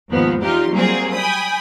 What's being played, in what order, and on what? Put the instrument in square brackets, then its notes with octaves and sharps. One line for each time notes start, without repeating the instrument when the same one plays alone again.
[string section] D#2 G#2 F3 B3
E2 D#4 F4 G4 C6
F#3 G3 A#3 C4 F4 G#4
G5 G#5 B5 D#6